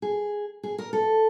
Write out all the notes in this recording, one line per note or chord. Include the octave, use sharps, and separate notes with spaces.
G#4
G#4
A#4
A4